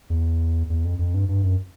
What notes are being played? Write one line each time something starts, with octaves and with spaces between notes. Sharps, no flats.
E2
E2
F2
F2
G2
G2
F#2